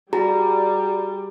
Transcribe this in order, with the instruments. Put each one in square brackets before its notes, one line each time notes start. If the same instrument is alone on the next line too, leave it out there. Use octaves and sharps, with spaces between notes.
[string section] G3 [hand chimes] F#4 G#4 A#5